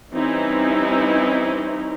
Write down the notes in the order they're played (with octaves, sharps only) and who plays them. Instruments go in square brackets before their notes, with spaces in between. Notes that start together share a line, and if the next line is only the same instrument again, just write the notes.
[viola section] E3 G3 C4 C#4 D#4 E4